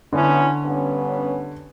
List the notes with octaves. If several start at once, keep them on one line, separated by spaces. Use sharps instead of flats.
D3 B3 C#4 E4
G2 B3 C#4